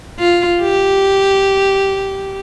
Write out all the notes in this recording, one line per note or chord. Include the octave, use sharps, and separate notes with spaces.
F4
G4